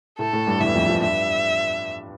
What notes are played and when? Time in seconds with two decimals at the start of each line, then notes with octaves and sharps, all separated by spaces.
0.19 A2 A3 A4
0.33 A2 A3
0.47 G2 G3
0.60 E2 E3 E5
0.75 F2 F3
0.89 F2 F3
1.02 G2 G3 E5